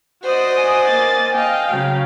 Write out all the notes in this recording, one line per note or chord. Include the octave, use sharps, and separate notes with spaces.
F#4 C5 D5 D#5 D#6
G#5
A#3 A6
D#5 F5 G5
C#3 F#3